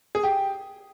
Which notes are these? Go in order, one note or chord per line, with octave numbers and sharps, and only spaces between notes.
G#4
G4